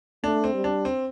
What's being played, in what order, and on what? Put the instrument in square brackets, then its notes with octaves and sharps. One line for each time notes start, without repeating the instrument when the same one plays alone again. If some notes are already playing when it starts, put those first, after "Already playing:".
[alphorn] A3 [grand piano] D4
[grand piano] C4
[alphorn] G3
[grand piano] D4
C4